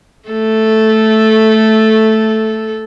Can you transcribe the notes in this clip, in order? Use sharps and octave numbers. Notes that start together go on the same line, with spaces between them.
A3 A4